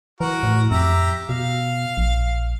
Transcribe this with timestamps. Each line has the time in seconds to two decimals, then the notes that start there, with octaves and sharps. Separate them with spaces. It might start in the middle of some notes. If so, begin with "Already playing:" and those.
0.20 E3 F#4 A#4
0.43 A2
0.71 F2 G4 E5 A#5
1.29 B2 F5
1.97 A#1